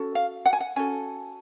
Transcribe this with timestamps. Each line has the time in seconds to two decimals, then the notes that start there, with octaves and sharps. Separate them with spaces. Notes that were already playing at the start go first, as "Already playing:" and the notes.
Already playing: C#4 F#4 A4
0.15 F5
0.46 F#5
0.53 G#5
0.60 F#5
0.76 C#4 F#4 A4 G#5